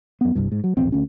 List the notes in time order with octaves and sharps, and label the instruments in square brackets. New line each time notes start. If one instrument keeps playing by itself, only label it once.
[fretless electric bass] F#2 B3
G1 C2 G2
G#2
F#3
D1 A#1 E2 C4
D2 C#4